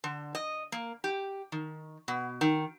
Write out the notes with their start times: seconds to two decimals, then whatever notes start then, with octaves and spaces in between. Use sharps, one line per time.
0.04 D3
0.35 D#5
0.72 A#3
1.04 G4
1.52 D#3
2.08 B2
2.41 D#3